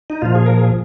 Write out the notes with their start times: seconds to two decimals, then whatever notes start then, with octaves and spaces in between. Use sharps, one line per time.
0.10 D#4
0.22 A#2 F3 F4
0.35 G#4
0.46 A#4
0.58 G#4